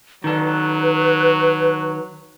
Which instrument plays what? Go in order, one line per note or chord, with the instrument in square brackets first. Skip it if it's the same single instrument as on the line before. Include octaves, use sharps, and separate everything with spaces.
[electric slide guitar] D#3 A4 [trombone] F#3 [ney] B4